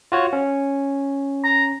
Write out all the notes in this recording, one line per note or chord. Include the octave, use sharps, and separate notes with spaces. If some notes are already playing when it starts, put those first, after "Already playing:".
F4 F#4 C#5
C#4
A#5